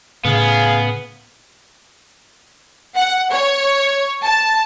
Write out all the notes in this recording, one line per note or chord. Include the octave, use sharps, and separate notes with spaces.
A2 C#3 B3 G#4 F5
F#5
C#5
A5